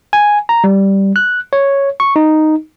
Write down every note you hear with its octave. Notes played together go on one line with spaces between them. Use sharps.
G#5
A#5
G3
F#6
C#5
C#6
D#4